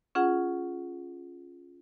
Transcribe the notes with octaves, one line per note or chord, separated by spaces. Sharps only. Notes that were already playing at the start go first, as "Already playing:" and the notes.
C#4 F4 G#4 F#5